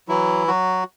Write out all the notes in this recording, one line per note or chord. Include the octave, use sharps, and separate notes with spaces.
E3 F#3 E4
F#3 F#4